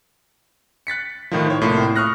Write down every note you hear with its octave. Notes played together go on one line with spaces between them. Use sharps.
F#6 A6 B6 C#7
A2 D#3 F3
C5 C#5
C2 A2 A#3 F4
C#6 D#6 F6 F#6 A#6